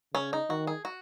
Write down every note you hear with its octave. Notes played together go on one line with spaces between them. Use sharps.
C#3 C#4
D#4
D#3 F#4
G#4
F#4